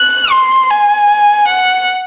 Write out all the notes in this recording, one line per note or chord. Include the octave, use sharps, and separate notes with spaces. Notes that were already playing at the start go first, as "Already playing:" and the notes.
Already playing: F#6
C6
G#5
F#5